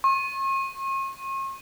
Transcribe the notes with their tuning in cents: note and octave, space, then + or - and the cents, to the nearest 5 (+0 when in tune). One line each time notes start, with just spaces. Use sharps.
C#6 -45